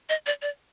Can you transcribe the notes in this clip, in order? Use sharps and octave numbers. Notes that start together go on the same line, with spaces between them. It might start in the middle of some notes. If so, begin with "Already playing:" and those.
D#5
D5
D5